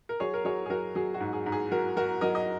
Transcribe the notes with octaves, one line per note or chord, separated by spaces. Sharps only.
A#4
F#3 G#4 C#5
A#4
F#3 G#4 C#5
G#4
F#3 F#4 A#4
F#3 G#4
F#4
G#2
G#4
G#2
G#4
F#3 F#4 A#4
F#3 F#4 A#4
F#3 A#4 D#5
D#5